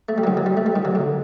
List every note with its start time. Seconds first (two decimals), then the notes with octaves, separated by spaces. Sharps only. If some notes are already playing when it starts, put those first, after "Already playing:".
0.09 A3
0.18 G3
0.24 F#3
0.27 D#3
0.37 F#3
0.46 G3
0.57 A3
0.66 G3
0.76 D#3
0.85 F#3
0.95 D3